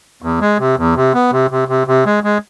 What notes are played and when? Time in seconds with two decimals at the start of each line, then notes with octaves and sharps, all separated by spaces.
0.22 E2
0.41 G#3
0.59 C3
0.77 E2
0.96 C3
1.14 B3
1.32 C3
1.51 C3
1.68 C3
1.87 C3
2.06 G#3
2.24 G#3